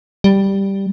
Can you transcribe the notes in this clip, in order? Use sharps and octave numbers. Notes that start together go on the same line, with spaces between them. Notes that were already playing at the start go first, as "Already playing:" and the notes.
G3